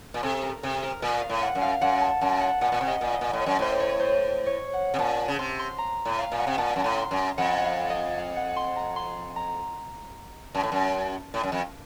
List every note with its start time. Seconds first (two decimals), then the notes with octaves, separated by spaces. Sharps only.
0.14 A#2
0.23 C3 A4
0.43 A#4
0.63 C3
0.83 A#4
1.02 A#2 A#4
1.22 F5
1.29 A2
1.42 F#5
1.55 F#2
1.62 F5
1.81 F#2 F#5
2.01 A5
2.21 F#2 A5
2.41 F#5
2.61 A#2 F#5
2.72 A#2
2.81 C3
2.88 D#5
3.01 A#2
3.14 D#5
3.21 A#2
3.33 A2
3.40 C#5
3.46 F#2
3.59 A2 C5
3.80 C#5
4.00 C5
4.46 C#5
4.73 F#5
4.94 C3
4.99 A#2 A5
5.28 C#3
5.39 C3 C6
5.59 C6
5.78 A#5
6.05 A2
6.19 F5
6.32 A#2
6.39 F#5
6.47 C3
6.58 A#2 A5
6.76 F#2 A#5
6.84 A2
6.97 C6
7.11 F#2
7.18 C6
7.38 F2 F#5
7.58 F#5
7.64 F5
7.90 D#5
8.17 F5
8.36 F#5
8.56 C6
8.76 A#5
8.96 C6
9.36 A#5
10.55 F#2 A5
10.63 A2
10.72 F#2
11.34 A2
11.43 F#2
11.52 F2